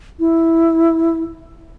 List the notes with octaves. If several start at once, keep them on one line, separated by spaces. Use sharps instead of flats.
E4